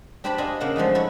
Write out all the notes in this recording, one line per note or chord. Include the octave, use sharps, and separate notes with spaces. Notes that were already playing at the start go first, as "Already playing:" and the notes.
D4 G4 C5 D5 A5 B5
D4 F4 G#4 D#5
C#3 A#3 D4 F#5
F3 G#3 A3 D#4
E4 A4 C#5 F#5